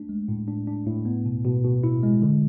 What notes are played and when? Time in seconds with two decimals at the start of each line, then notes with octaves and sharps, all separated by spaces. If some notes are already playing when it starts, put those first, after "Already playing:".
Already playing: A3 D4
0.09 G#3
0.28 A2
0.48 D4
0.67 D4
0.86 A2
1.05 B3
1.25 B2
1.45 B2
1.64 B2
1.84 E4
2.03 G#3
2.22 D3